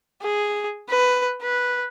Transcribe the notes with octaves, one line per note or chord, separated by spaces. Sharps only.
G#4
B4
B4